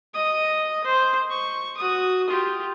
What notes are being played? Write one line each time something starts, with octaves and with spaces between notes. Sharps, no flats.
D#5 D#6
C5
C#6
F#4 D#6
F4 G4